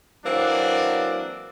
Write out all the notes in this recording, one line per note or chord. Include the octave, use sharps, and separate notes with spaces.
E3 F#3 A#3 C4 D4